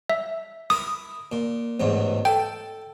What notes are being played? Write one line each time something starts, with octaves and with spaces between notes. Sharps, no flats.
E5
E4 A#4 D#6
A#2
A1 E2 G#2
A4 G5